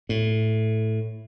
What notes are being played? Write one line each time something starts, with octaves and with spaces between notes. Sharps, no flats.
A2